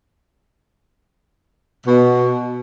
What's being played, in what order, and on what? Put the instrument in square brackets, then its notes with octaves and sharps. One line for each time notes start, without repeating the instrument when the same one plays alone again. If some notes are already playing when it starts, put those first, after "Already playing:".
[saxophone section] B2